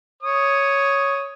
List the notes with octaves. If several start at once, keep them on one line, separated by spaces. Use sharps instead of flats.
C#5 D#6